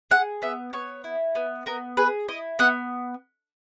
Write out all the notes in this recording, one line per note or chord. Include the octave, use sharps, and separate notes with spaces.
G#4 F#5
B3 E5
B3 C#5
E4
B3
B3 A#4
G#4 B4
E4 D#5
B3 F#5